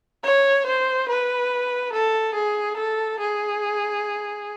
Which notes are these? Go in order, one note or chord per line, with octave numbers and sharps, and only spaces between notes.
C#5
C5
B4
A4
G#4
A4
G#4